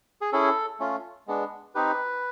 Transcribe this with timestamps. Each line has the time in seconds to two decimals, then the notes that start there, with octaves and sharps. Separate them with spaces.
0.21 G#4
0.33 C#4 E4 G#4 A4
0.80 A3 C#4 F4
1.27 G#3 B3 D4
1.75 C4 D#4 G4 B4